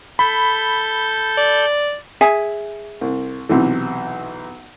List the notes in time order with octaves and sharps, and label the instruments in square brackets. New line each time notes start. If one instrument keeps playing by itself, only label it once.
[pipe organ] A4 G6 [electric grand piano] B5
[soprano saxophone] D5
[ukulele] G#4 E5 G#5
[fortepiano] C2
B1 C3 E3